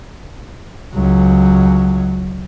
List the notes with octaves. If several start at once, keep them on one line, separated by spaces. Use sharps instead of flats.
C#2 F#3